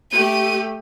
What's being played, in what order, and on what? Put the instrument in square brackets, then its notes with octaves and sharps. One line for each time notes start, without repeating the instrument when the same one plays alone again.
[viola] A3 G4 [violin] D#7